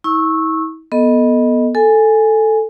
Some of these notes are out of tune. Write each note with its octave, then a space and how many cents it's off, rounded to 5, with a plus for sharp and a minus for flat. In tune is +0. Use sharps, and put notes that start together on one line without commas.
E4 -45 C#6 -15 E6 -10
B3 -15 A4 +0 D#5 +0
A4 +0 G#5 +0